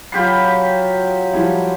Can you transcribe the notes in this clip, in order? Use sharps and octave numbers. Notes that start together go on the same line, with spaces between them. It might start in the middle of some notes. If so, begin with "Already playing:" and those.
F#3 F4 G4 B5 C7
F3 G3 E4